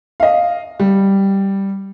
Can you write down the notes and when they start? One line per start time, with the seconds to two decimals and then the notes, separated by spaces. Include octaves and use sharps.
0.20 D#5 F5
0.80 G3